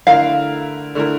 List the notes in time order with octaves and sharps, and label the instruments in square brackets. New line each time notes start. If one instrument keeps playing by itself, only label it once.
[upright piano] D3 A3 E4 A#4 [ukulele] F5
[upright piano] D3 A3 E4 A#4